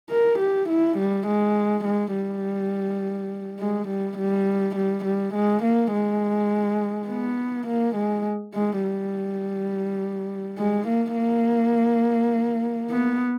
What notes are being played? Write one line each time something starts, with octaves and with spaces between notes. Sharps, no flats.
A#4
G4
E4
G3
G#3
G#3
G3
G#3
G3
G3
G3
G3
G#3
A#3
G#3
B3
A#3
G#3
G#3
G3
G#3
A#3
A#3
B3